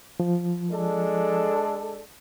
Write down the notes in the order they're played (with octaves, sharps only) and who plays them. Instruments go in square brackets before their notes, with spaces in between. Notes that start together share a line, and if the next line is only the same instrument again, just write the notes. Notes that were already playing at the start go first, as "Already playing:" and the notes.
[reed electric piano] F3
[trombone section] G#3 D4 A4